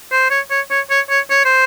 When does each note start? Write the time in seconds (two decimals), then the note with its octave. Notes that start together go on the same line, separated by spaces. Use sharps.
0.12 C5
0.30 C#5
0.51 C#5
0.71 C#5
0.90 C#5
1.10 C#5
1.30 C#5
1.45 C5